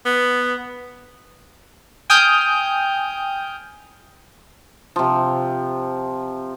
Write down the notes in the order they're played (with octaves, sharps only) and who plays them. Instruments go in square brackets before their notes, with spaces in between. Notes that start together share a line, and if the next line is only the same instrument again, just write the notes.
[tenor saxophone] B3
[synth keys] G5 G#5 D#6 F6 G6
[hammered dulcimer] C3 F3